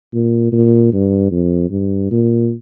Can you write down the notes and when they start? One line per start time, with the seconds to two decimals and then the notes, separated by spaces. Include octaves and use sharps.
0.13 A#2
0.52 A#2
0.93 G2
1.31 F2
1.71 G2
2.11 A#2